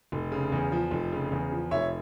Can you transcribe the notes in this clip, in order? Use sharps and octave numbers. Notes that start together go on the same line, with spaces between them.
F1
C#3
E2
F3
F1
C#3
E2
F3
F1 C#5 E5